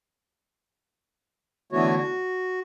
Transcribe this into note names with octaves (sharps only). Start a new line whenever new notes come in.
D3 E3 A3 B3 F#4 C#5
F#4